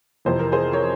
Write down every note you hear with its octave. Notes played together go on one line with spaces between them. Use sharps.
F2 C3 E3 C5
A#4
G#4 C5
A#4 C#5